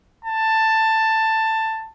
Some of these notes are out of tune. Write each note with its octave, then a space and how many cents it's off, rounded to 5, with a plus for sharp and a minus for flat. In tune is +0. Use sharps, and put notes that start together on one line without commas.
A5 +10